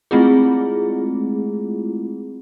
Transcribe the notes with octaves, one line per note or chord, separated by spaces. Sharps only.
G#3 A3 C4 E4 F4 G#4